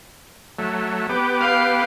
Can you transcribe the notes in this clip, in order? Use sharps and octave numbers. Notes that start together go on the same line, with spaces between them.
F#3 A3
B3 G4 D6
F5